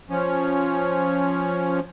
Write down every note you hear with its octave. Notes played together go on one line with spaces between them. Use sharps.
F3 C#4